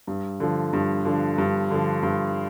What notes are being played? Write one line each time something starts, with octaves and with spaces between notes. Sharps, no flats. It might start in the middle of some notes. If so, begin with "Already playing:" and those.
G2
D3 F3
G2
D3 F3
G2
D3 F3
G2